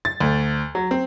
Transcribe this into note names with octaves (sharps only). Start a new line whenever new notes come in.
A6
D2
F#3
C4